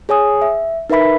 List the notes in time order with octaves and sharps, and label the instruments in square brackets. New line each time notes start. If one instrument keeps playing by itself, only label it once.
[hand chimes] G#4 C#5 G#5 D#6
E5
D#4 A#4 B4 E5 B5 B6